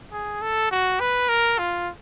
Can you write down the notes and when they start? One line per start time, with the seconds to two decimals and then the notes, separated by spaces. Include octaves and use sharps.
0.12 G#4
0.42 A4
0.71 F#4
1.00 B4
1.29 A#4
1.58 F4